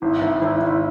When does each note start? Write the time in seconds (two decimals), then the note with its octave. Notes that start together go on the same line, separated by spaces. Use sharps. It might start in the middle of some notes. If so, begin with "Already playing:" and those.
0.02 G#1 E4
0.21 G#1
0.42 G#1
0.61 G#1